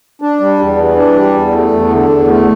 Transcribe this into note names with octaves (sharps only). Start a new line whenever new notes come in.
D4
G3
E2
E3
D4
G3
E2
A3
E2
D3
E2
A3